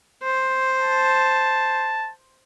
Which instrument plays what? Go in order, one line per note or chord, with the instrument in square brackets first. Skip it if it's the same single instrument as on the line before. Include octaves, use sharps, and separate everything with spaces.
[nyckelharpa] C5
[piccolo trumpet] A5